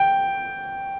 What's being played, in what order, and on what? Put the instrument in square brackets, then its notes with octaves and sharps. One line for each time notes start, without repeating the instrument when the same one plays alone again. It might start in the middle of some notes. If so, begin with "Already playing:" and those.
Already playing: [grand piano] G5